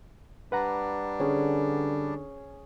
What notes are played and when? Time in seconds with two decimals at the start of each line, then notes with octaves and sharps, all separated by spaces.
0.52 G3 D4 B4 F#5 A#5
1.20 D3 C#4 G#4